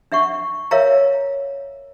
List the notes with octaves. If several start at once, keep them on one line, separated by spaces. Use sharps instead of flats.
D4 E5 F#5 C#6
A#4 C#5 E5 F5 A#5